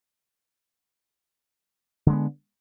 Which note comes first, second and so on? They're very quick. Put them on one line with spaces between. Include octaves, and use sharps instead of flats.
D3 G#3 B3